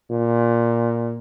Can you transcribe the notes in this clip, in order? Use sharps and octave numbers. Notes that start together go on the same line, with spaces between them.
A#2